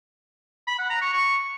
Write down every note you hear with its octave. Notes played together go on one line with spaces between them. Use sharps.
B5
F#5
A#5
C#6
C#6